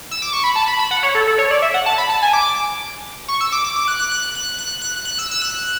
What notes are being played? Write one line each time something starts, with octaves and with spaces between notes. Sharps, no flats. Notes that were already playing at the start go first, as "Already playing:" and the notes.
E6
D6
C#6
B5
A5
B5
B5
F#5
C#5
A4
A4
C#5
D5
E5
F#5
A5
B5
A5
G#5
D6
C#6
E6
D6
D6
D6
F#6
F#6
F#6
F#6
F#6
F#6
F#6
E6
E6
F#6